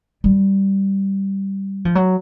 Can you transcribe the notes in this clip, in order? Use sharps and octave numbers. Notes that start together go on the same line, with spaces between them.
G3
F3
F#3